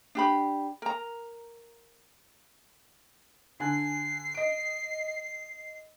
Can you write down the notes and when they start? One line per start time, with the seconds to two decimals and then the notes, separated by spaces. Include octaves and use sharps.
0.15 D4 G4 B5
0.82 A#4 A#5
3.60 D3 G#5 F#6 C7
4.34 D#5 D7